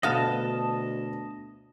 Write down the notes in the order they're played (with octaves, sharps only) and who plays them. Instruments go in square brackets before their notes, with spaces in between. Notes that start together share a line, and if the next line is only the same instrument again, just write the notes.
[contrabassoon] D2 [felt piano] B2 A3 [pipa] B3 F5 [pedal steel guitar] D#5 A5